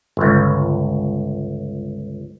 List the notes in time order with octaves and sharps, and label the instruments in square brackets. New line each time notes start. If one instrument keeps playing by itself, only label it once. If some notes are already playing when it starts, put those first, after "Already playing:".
[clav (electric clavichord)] G1 C#2